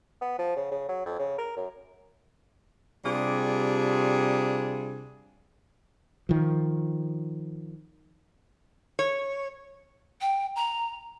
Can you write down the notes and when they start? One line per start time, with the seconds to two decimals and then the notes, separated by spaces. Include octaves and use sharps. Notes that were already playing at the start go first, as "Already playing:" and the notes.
0.21 B3
0.39 F3
0.56 C#3
0.71 C#3
0.89 F#3
1.06 F2
1.19 C#3
1.38 A#4
1.57 F#2
3.05 C3 G3 D4 F4 G#4
6.29 D#3 F3
8.99 C#5
10.20 G5
10.56 A#5